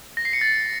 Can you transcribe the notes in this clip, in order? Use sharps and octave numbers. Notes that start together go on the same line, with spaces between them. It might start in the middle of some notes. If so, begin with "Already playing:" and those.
A#6
C7
C#7
A6